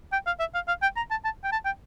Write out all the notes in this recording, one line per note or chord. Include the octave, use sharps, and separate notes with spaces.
G5
F5
E5
F5
F5
G5
A#5
A5
A5
G5
A5
G5